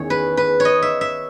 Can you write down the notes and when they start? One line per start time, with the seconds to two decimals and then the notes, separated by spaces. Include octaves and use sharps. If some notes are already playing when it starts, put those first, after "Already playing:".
Already playing: E2 D#3 C#4 G#4 C#5
0.10 B4
0.37 B4
0.60 C#5
0.65 D#5
0.82 E5
1.01 E5